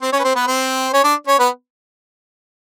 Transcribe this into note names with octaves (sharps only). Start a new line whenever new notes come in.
C4 C5
C#4 C#5
B4
C4 C5
B3 B4
C4 C5
C#4 C#5
D4 D5
C#4 C#5
B3 B4